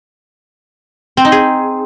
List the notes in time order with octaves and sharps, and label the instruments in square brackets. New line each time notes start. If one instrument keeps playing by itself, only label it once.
[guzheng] C4
D#4
G#4